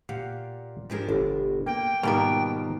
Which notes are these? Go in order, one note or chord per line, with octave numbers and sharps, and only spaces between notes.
A#2 G4 F5 F#5
G#2 F3 D4 G4 G#4 A#4
G1 B2
A#3 G5
G#2 B2 D#3 G3 A#3 B3 F4 A#4